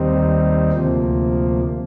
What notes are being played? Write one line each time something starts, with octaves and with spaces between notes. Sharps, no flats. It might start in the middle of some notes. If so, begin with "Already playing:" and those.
Already playing: D#2 D#3 G3 C4 D#4
D2 C3 F3 A#3